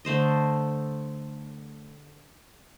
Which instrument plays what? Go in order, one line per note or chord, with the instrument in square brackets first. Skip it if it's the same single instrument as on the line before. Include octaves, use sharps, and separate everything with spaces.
[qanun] D3 A3 C5 D#5